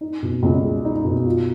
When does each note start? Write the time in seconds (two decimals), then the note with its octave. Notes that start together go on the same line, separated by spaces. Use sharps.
0.01 D#4
0.22 B2
0.43 C#2
0.64 G#3
0.85 D#4
1.05 B2
1.26 F4